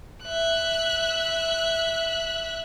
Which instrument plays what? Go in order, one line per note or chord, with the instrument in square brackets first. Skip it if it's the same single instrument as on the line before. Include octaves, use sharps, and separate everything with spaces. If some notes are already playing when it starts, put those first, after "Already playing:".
[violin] E5 F#6